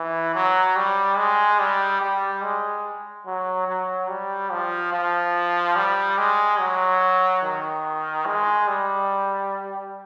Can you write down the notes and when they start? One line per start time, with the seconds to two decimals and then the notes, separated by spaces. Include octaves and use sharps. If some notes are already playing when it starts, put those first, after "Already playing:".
Already playing: E3
0.35 F#3
0.76 G3
1.18 G#3
1.60 G3
2.01 G3
2.43 G#3
3.26 F#3
3.68 F#3
4.09 G3
4.52 F3
4.93 F3
5.76 G3
6.18 G#3
6.60 F#3
7.43 D#3
8.26 G#3
8.68 G3